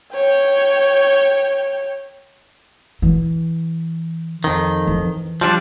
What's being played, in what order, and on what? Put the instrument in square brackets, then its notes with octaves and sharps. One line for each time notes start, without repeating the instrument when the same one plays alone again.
[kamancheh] C#5 G5
[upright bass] E3
[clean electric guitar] F2 D#3
[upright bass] E3
[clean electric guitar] F3 G3 D4